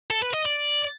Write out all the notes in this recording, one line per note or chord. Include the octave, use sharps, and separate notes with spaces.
A4
B4
D#5
D5